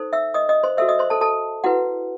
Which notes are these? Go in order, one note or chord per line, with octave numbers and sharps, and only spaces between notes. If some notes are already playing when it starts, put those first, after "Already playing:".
Already playing: D#4 A4 C5
E5 E6
D#5 D#6
D#5 D#6
C5 C6
F#4 A4 C5 E5 E6
D#5 D#6
C5 C6
A4 A5
A4 A5
E4 F#4 B4 F#5